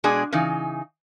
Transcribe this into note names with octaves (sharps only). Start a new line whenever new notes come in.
B2 G#3 D4 G#4 D5 G#5
C#3 E3 D#4